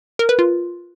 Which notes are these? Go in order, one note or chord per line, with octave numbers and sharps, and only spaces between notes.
A#4
B4
F4